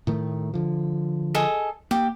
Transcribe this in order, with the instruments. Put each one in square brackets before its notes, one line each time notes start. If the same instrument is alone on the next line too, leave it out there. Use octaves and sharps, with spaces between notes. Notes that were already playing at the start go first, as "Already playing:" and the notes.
[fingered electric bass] A2 D#3 A3
D3 F3
[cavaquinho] G#4 A4 D#5
[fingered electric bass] A#3 [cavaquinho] G4